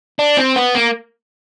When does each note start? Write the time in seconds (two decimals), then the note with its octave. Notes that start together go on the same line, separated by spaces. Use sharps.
0.19 D4
0.37 C4
0.56 B3
0.75 A#3